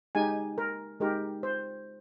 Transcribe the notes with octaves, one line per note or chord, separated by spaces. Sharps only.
G#3 D#4 G4 G#5
A#4
G#3 D#4 G4 A#4
C5